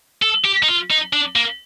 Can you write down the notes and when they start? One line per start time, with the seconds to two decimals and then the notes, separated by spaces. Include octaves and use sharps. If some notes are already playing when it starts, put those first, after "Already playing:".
0.22 A4
0.45 G4
0.63 D#4
0.69 F4
0.91 D#4
1.13 D4
1.36 A#3